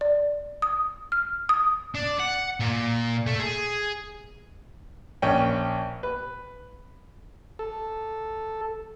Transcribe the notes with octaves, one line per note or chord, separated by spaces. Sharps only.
D5
D#6
F6
D#6
D4
F#5
A#2
A3
G#4
A#1 C#4 G5
B4
A4